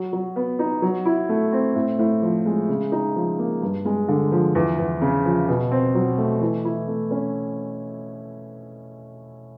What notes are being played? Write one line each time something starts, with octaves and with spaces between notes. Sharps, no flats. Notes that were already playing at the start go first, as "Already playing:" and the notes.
Already playing: F#3
F#3
B3
D#4
F#3
E4
A3
C4
A2
A2
F3
G#3
C#3
D#4
F3
A#3
G2
G#3
D3
F3
E2
E2
C#3
F3
B2
C4
F#3
A3
E3
E4
A3
C#4